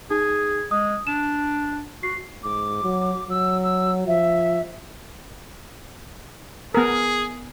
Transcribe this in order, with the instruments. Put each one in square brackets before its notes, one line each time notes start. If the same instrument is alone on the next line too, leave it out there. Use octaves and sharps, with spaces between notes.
[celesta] D#4 [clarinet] G#4
[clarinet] G#3 [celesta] D#6
[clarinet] D4 [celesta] E7
[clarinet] F#4 [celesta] C7
[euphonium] G#2 [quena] D6
[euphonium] F#3
[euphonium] F#3 [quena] E6
[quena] E6
[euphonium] F3 [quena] E5
[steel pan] B3 A#4 [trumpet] G#4